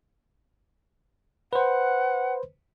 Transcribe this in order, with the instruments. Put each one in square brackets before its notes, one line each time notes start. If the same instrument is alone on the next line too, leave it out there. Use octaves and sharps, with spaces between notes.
[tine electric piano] B4 C5 [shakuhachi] F#5